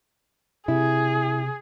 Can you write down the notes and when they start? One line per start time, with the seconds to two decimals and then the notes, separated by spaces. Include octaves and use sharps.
0.68 C3 E4 G#4